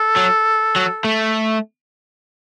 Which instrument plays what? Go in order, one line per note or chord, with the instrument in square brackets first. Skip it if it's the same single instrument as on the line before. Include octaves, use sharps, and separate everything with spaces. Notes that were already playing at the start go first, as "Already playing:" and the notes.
Already playing: [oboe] A4
[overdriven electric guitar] F#3
F#3
A3